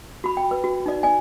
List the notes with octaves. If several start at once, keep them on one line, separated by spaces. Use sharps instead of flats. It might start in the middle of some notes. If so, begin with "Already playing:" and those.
F#4 B5
G5
B4
F#4
D#4 D5
D5 G#5